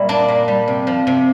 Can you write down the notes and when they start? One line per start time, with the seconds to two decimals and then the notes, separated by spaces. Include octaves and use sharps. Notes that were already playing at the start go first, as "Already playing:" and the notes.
Already playing: A#2 G3 E4
0.09 A#3 D4
0.28 A#2
0.48 G3
0.68 C3
0.87 F3
1.07 C3